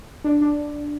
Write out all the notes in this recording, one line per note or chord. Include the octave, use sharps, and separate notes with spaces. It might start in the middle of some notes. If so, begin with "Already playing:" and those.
D4
D4